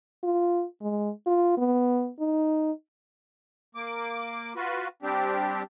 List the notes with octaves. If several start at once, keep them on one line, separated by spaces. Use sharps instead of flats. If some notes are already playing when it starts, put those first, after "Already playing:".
F4
G#3
F4
B3
D#4
A#3 D6
F4 F#4 B4
G3 C4 D4 G4